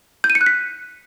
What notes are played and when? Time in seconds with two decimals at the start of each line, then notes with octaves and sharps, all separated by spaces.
0.24 G6
0.30 D#7
0.35 C#7
0.41 F#6
0.46 B6